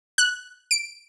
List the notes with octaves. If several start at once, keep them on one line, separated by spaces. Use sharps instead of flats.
F#6
D7